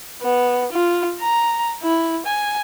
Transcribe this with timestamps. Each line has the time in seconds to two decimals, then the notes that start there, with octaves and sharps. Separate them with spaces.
0.21 B3
0.72 F4
1.20 A#5
1.83 E4
2.26 G#5